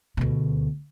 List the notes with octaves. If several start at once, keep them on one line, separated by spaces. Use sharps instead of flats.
D2 B2